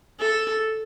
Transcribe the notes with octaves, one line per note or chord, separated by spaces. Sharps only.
A4